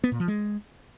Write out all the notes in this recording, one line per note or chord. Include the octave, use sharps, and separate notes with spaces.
B3
A#2
F3
G#3